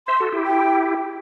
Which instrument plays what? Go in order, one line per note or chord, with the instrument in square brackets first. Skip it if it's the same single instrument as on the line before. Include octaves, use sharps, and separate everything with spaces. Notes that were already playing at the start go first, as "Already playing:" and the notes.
[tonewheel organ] C5 E5 [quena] C6
[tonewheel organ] F#4 A4
E4 G4
[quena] G5